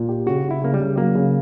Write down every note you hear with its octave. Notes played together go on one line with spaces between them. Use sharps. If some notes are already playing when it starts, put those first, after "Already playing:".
Already playing: A#2
G4
C#3 F#4
C#3
E4
C#3 A#3
G3
C#3
F#3 A#3
C#3